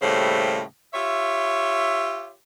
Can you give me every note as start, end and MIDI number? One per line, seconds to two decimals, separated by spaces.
0.01 0.61 39
0.01 0.61 45
0.01 0.61 49
0.01 0.61 55
0.01 0.61 57
0.01 0.61 72
0.93 2.31 65
0.93 2.31 67
0.93 2.31 73
0.93 2.31 76